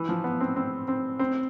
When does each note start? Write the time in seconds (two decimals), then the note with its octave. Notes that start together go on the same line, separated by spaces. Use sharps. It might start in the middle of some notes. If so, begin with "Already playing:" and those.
Already playing: E3
0.09 F3
0.24 B3
0.41 C4
0.56 C4
0.88 C4
1.19 C4